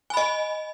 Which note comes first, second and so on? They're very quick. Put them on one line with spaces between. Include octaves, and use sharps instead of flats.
G#5 B5 D#5